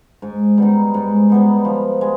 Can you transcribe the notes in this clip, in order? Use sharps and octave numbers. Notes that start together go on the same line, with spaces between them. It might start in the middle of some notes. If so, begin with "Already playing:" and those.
G#2
G3 B3 D#4
G#2
G3 B3 D#4
F3
G#3